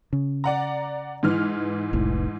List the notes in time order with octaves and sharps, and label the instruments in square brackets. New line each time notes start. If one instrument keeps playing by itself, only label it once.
[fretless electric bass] C#3
[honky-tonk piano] D5 F#5 A#5
G#2 E3 F6
[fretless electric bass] F1 C2 A2